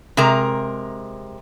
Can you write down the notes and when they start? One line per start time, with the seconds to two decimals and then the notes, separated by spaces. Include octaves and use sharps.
0.17 C3 G#3 A#4 A#5